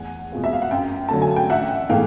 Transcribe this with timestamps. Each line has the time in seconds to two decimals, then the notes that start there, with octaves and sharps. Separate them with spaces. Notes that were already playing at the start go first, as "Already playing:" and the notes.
Already playing: E2 F#5 G#5
0.32 B2 G#3 C4 F4
0.44 E5
0.53 F5
0.62 F#5
0.71 F#2 F5 G5
1.09 D3 F#3 A5
1.22 G#5
1.36 G5
1.50 A1 E5 F#5
1.89 A2 E3 G#3 B3 F5 G5